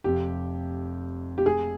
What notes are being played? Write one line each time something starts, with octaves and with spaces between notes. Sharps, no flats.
F1 F2 C3 G4
G4
G#4